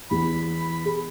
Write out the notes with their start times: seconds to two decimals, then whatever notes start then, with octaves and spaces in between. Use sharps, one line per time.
0.11 E2 B5
0.85 G#4